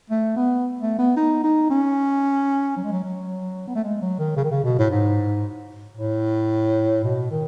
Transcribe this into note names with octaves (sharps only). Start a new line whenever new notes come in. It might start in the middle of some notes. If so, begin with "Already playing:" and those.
A3
B3
A3
B3
D#4
D#4
C#4
F#3
G#3
F#3
F#3
B3
A3
G#3
F#3
D#3
C#3
D#3
C#3
B2
A2
G#2
A2
B2
D#3